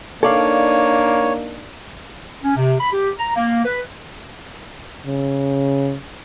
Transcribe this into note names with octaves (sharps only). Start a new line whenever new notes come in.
A#3 D4 D#4 A4 C#5 D5 F5
C#4
C3
B5
G4
A#5
A#3
B4
C#3